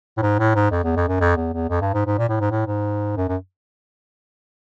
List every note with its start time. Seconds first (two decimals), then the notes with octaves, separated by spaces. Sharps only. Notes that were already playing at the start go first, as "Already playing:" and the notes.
0.17 A2
0.22 G#2
0.39 A2
0.55 G#2
0.71 F2
0.84 E2
0.96 F2
1.08 F#2
1.20 F2
1.36 E2
1.53 E2
1.69 F2
1.81 G2
1.94 G#2
2.06 G#2
2.18 A#2
2.29 A2
2.40 G#2
2.51 A2
2.67 G#2
3.16 F#2
3.28 F#2